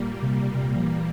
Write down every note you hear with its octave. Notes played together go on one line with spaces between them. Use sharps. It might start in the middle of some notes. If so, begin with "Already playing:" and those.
Already playing: A#2 G3 A#3
C3
C3
F3
E3